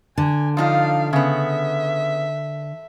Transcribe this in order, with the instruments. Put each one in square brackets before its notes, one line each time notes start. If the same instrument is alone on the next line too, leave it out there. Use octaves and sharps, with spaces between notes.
[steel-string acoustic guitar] D3 [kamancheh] G#5
[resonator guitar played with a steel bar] F3 D#4 F4 [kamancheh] D4 F5
[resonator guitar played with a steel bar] C#3 B3 [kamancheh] E5